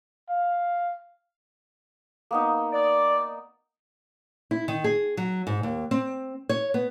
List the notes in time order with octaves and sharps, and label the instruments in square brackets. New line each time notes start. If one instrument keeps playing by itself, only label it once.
[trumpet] F5
[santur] A#3 B3 D#4
[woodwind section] D5
[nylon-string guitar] E4
D#3
G#4
F#3
G#2
D#2
C4
C#5
B3